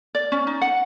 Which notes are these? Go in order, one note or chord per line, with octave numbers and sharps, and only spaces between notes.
D5
C#4
D#4
F#5